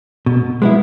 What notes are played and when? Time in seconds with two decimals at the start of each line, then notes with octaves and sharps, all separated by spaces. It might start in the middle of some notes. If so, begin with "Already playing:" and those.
0.26 B2
0.62 G#3 B3 E4